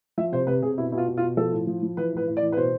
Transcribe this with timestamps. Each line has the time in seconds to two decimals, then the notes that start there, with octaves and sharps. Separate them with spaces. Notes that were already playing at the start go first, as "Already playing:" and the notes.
0.18 F3 E5
0.32 C3 C5
0.47 C3 B4
0.62 C3 G#4
0.78 B2 E4
0.92 B2 E4
0.98 F4
1.08 B2
1.17 F4
1.22 B2
1.37 F3 A4
1.52 A2
1.67 F3
1.83 F3
1.97 E3 B4
2.13 A2 B4
2.27 A2
2.37 D5
2.42 E3
2.52 B4
2.57 B2 C5